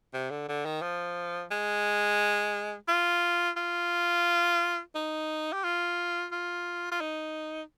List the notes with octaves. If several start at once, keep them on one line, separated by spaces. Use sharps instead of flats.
C3
D3
D3
D#3
F3
G#3
F4
F4
D#4
G4
F4
F4
F4
D#4